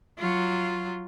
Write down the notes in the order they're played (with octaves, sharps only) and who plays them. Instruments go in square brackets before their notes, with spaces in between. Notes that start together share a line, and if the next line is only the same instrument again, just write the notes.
[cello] F#3 F4